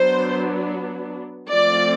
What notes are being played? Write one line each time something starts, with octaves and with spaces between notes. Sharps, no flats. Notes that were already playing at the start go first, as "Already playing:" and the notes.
Already playing: F#3 B3 D4 C5
F3 A3 C4 D5